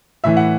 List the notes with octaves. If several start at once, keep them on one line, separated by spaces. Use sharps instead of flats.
A2 E3 E5
F#5